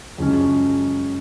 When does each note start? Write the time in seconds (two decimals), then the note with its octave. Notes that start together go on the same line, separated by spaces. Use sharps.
0.18 F#2 C#3 F3 G#3 C#4